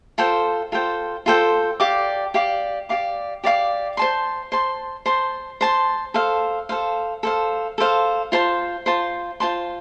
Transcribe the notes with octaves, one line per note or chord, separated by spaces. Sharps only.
F4 A4 C5 G5
F4 A4 C5 G5
F4 A4 C5 G5
G4 D5 F5 D6
G4 D5 F5 D6
G4 D5 F5 D6
G4 D5 F5 D6
C5 A5 C6
C5 A5 C6
C5 A5 C6
C5 A5 C6
A4 C5 F5
A4 C5 F5
A4 C5 F5
A4 C5 F5
F4 C5 A5 C6
F4 C5 A5 C6
F4 C5 A5 C6